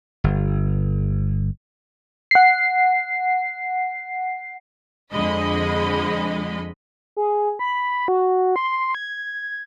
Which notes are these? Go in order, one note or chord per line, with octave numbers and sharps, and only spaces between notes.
G1
F#5 C7
F2 D3 G#3 D#5 B5
G#4
B5
F#4
C6
G#6